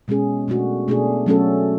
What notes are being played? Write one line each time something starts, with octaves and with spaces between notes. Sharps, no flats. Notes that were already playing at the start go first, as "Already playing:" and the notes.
B2 G#3 C#4 G#4
B2 A3 D4 F#4
B2 A3 D4 G#4
F#3 A3 C#4 F#4 A4